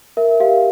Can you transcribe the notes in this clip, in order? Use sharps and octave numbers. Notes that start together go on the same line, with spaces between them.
A#4 E5
G4 F5